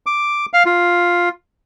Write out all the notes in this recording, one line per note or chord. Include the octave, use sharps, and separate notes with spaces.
D6
F5
F4